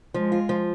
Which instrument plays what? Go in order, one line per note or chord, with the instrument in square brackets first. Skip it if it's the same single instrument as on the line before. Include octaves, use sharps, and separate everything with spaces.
[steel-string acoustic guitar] F3 [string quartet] G#3
[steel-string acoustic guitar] F4
F3